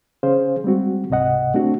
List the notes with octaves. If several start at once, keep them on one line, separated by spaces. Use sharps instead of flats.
C#3 C#4 G#4 C5 F5
G3 G#3 C4 F#4
C#2 G#2 C3 D#5 F#5
A3 C4 D4 F#4